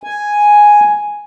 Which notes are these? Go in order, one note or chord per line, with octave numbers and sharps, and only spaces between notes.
G#5